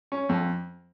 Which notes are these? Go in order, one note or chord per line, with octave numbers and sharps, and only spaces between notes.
C#4
F2